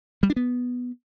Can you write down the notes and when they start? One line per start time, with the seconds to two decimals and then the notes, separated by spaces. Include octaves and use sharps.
0.23 G3
0.30 D4
0.36 B3